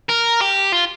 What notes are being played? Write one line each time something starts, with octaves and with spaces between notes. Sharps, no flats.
A#4
G4
F4